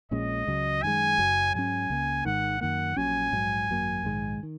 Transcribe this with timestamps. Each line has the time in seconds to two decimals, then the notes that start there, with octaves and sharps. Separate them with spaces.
0.11 A#1 A#2 G#3 C#4 D#5
0.47 C#2 C#3 F#3
0.83 F#2 D#3 G#3 G#5
1.18 F#1 F#2 F#3
1.54 G#2 F#3 C#4 G#5
1.90 C#2 C#3 A#3
2.25 G#1 G#2 D#3 F#5
2.61 F#2 D#3 A#3 F#5
2.96 A#1 A#2 F#3 C#4 G#5
3.33 A#1 G#2 F#3
3.69 G#1 F#2 F#3 A#3
4.04 A#1 G#2 D#3 G#3
4.43 D#3